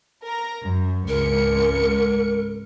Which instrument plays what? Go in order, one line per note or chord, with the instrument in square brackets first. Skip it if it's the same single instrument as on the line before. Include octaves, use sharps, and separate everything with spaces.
[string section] A#4 A#5
F#2
[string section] G#1 C#2 C#7 [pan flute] A#4